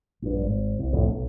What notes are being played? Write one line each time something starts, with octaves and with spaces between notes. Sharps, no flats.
A#1 G2
G#1
C2
C2 F2 A2
B1